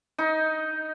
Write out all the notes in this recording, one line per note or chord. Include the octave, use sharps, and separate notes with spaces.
D#4